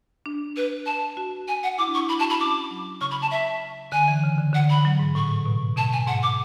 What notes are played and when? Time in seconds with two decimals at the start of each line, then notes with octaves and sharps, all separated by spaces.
0.26 D4
0.56 B4
0.86 A5
1.17 F#4
1.48 G#5
1.63 F#5
1.78 E4 D6
1.88 D4
1.94 C#6
1.98 E4
2.09 E4 B5
2.19 F#4 A5
2.29 E4 B5
2.40 C#4 D6
2.71 F#3
3.01 C#3 C#6
3.11 B5
3.22 A5
3.31 E5
3.92 D3 G#5
4.08 E3
4.23 C#3
4.38 D3
4.53 D3 F#5
4.70 B5
4.85 F#3
4.99 G#2
5.15 A2 C#6
5.46 B2
5.76 B2 A5
5.92 G#5
6.07 G#2 F#5
6.23 D6